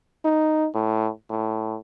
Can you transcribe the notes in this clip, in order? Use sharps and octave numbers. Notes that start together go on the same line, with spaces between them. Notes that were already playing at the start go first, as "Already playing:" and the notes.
D#4
A2
A2